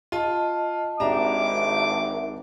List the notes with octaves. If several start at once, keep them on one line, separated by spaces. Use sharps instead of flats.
F4 D#5 A5
G#1 D4 G4 E5 A#5 D6